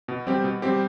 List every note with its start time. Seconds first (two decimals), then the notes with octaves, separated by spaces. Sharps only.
0.08 B2
0.27 G3 C4 G4
0.44 B2
0.62 G3 C4 G4